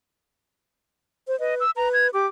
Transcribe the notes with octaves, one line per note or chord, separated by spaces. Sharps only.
C5
B4 D#5
E6
B4 A#5
G#6
G4 D6